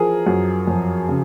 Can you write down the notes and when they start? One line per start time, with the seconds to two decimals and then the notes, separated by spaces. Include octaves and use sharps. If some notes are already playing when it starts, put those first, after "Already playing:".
Already playing: E3 F3 G#4 A#4
0.26 F#2
0.67 F2
1.09 C#3